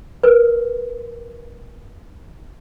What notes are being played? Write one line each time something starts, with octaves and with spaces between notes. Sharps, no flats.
A#4 B4